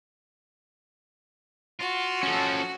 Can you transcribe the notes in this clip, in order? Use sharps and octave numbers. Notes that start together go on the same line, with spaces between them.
F4 F#4
F3 C#4 A4